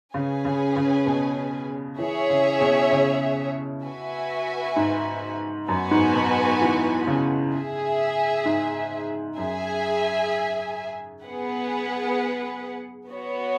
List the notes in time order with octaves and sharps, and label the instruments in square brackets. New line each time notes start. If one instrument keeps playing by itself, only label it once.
[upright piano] C#3 [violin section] C#4 G#4 B4 G#5
[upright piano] C#3
C#3
B2
[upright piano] E3 [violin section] G#4 C#5 E5
[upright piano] C#3
B2
C#3
[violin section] F#4 B4 E5 G#5
[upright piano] G#2
[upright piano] F#2 [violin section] B3 F#4 B4 G#5
[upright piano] G#2
B2
E3
C#3
[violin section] G#4 E5 G#5
[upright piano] G#2
[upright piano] F#2 [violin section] G#4 E5 G#5
[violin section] B3 G#4 B4 F#5
B3 F#4 C#5